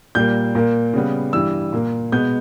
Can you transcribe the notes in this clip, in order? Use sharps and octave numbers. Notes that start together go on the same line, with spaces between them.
A#2 G3 A#3 G6
A#2 A#3
C#3 G3 B3
G2 E3 G3 E6
A#2 A#3
B2 G#3 B3 G6